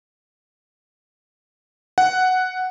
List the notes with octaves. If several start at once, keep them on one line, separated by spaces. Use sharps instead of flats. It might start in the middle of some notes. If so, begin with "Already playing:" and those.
F#5